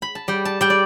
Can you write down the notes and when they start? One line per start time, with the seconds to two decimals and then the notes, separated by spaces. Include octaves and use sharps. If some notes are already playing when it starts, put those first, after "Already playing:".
0.02 B5
0.15 A5
0.28 G3 G5
0.45 A5
0.61 G3 G5
0.70 D5